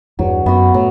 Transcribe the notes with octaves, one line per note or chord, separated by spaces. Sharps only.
E2 G2 F#3
F#2 B3 F#4
A2 F#3